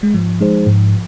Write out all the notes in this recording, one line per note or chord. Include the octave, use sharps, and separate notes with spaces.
G#3
G#2 F3
G#3 D#4 G#4 C5
G#2